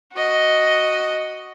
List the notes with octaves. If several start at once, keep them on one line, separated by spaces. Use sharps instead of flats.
F#4 D#5